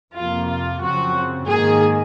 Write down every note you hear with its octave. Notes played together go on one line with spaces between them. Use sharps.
F2 C3 F3 A#3 F4
F4
F#2 C#3 F3 C4 F#4
G#2 D#3 A#3 G#4